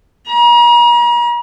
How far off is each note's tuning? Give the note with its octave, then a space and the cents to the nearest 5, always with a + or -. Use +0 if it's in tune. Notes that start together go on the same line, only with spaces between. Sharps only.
A#5 +40